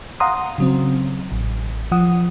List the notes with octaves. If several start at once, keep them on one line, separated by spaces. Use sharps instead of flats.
F5 F#5 A#5 C6 D#6
C#3 F#3 C4
A1
F3 F#5 D#6